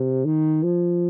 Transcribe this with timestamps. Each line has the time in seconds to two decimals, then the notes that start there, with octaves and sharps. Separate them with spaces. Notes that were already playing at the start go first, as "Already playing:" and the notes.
Already playing: C3
0.25 D#3
0.63 F3